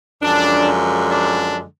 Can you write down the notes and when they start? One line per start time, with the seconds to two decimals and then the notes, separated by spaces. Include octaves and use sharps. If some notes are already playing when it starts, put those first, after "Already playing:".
0.22 F#2 D3 F3 G#3 D4
1.11 D4